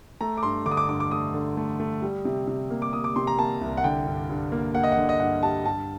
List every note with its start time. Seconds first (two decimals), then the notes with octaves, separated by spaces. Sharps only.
0.21 A3 A#5
0.37 D6
0.43 G2 C6
0.66 D3 D6
0.71 D#6
0.77 D6
0.89 G2 D6
1.00 D6
1.11 A3 D#6
1.34 D3
1.57 A3
1.80 A3
2.02 G3
2.25 C3
2.47 C3
2.70 A#3
2.82 D6
2.93 A#3 D#6
3.04 D6
3.16 C3 C6
3.27 A#5
3.38 A#3 A5
3.61 C2
3.77 F#5
3.84 D3 G5
4.07 G2
4.29 G2
4.52 A#3
4.74 A#3 F#5
4.83 D#5
4.92 F#5
4.97 D3
5.09 D#5
5.20 G2 F#5
5.43 G3 A5
5.66 G2 A5